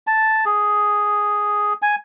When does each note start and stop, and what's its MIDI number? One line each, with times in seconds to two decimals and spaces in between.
0.07 0.45 81
0.45 1.73 68
1.82 1.95 80